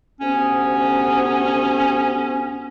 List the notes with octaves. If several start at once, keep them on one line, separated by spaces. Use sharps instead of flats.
D2 C3 B3 C#4